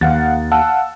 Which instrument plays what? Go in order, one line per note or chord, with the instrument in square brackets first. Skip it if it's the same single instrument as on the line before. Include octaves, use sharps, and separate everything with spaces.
[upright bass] D#2 [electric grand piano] F5 F#5 A6
[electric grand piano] F5 F#5 E6 [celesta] A5